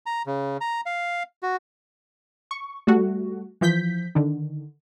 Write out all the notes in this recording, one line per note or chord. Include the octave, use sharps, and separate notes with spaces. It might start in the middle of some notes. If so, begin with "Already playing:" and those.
A#5
C#3
A#5
F5
F#4
C#6
G3 A3 F#4
E3 F3 G6 B6
D3 D#3